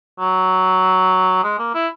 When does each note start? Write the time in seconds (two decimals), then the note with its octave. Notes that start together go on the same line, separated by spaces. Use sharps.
0.20 F#3
1.43 G#3
1.59 A#3
1.74 E4